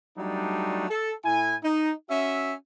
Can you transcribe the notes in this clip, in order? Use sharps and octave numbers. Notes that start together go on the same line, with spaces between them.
F#3 G3 A3 D4 D#4
A4
A2 E4 G#5
D#4
C#4 F#4 E5